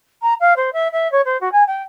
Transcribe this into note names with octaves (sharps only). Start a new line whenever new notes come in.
A#5
F5
C5
E5
E5
C#5
C5
F#4
G#5
G5